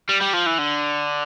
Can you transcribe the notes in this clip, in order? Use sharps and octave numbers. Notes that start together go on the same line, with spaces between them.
G3
G3
F3
E3
D3